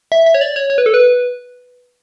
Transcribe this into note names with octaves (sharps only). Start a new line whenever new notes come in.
E5
E5
C#5
D5
C#5
C#5
B4
A4
B4